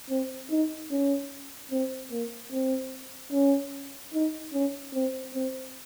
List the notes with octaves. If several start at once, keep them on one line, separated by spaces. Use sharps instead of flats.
C4
D#4
C#4
C4
A#3
C4
C#4
D#4
C#4
C4
C4